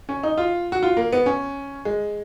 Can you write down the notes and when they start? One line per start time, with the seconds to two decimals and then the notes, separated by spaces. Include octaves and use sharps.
0.09 C#4
0.23 D#4
0.38 F4
0.72 F#4
0.83 F4
0.97 A#3
1.13 B3
1.26 C#4
1.85 G#3